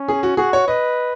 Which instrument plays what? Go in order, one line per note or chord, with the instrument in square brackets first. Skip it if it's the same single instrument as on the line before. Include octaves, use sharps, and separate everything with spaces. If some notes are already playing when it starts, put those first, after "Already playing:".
Already playing: [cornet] C#4
[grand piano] G#4
F#4
[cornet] F#4 [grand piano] G#4
[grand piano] C#5
[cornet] B4 [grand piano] D#5